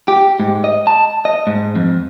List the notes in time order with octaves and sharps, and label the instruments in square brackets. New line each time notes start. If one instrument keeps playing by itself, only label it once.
[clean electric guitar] G4
G#2
D#5
A5
D#5
G#2
F2